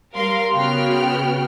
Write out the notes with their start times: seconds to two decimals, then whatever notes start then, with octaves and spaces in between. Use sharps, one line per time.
0.14 G3 A#4 F5 C6
0.54 C#3 B3 F#4 G5 F6